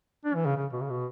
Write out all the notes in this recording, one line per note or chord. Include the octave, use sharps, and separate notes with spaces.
D4
E3
C#3
C#3
B2
C#3
B2